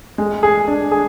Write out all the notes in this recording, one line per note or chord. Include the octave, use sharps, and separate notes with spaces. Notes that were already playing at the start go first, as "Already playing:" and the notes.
G#3
G#4
D4
G#4